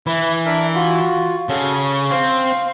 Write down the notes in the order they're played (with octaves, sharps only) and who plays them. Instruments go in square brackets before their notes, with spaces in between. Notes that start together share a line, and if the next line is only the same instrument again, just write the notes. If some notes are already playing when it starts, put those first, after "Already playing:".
[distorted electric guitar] E3 [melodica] E4 B5
[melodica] D4 A#4 E5
F4 F#4
[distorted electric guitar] C#3 [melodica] F#4 A4
[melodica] C#6
[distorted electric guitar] C4 [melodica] F5 C6